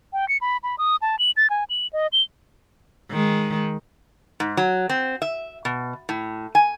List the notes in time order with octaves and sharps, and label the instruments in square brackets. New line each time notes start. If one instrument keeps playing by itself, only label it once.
[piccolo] G5
C#7
B5
B5
D#6
A5
F#7
A6
G#5
F#7
D#5
G7
[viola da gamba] D#3 G#3
[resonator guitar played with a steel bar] G#2
F#3
C4
E5
B2
A2
G#5